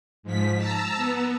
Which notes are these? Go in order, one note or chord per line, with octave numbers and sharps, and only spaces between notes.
G#2 F3 B6
A5 A#5 E6
B3